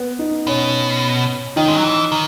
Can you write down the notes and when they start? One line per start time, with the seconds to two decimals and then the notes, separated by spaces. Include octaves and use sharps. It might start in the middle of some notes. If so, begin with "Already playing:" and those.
Already playing: B3
0.19 D#4
0.47 B2 C#4
1.56 D#3 D#4
1.68 G#3
1.76 F#3
1.84 E3
2.12 D#3